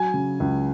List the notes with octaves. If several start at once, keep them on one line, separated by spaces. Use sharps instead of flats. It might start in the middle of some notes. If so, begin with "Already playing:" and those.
Already playing: F#3 G#5
C#3
C#2